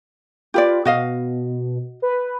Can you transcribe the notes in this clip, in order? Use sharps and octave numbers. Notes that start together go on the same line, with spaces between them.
F4 G4 B4 D5
B2 F#4 D#5 F5
B4